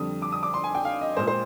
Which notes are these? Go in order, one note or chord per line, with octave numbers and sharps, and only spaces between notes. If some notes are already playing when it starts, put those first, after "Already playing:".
Already playing: F2 D3 G3 D#6
D6
D#6
D6
C6
G#5
G5
F5
D#5
A#2 G#3 C5
C5